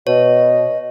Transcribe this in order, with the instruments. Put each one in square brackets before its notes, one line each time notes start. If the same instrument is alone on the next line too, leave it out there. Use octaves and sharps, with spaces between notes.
[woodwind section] B2 [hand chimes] C#5 [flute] D#5